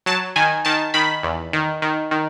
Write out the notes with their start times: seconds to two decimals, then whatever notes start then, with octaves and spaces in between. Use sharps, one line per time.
0.06 F#3 A5
0.36 D#3 G#5
0.65 D#3 A5
0.94 D#3 B5
1.23 E2
1.53 D#3
1.82 D#3
2.11 D#3